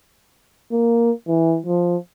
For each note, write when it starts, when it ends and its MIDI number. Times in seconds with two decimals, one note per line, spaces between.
0.72 1.11 58
1.28 1.59 52
1.66 1.97 53